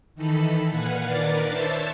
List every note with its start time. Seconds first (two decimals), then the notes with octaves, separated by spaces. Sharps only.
0.15 D#3 E3 D#4 A4 B5
0.70 A#2 B4 F5 F#5 G#5
1.05 D#3 D4 A#4 B4 D5 A6
1.48 C5 C#5 E5 A5